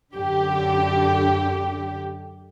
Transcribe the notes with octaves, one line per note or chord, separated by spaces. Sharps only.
F#2 D3 G4